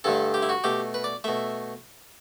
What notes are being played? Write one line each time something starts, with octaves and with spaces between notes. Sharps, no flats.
G2 D3 A3 A4
G4
E4
F#4
B2 A3 G4
B4
D5
B2 A3 E5